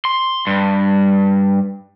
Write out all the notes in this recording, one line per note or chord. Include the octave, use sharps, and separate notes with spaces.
C6
G2